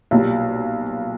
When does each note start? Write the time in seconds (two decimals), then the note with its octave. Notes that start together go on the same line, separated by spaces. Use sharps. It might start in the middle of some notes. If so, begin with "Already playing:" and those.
0.11 B1 A#2 G3